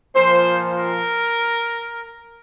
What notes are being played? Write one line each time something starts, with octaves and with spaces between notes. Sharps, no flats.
A#2 F3 C5
A#4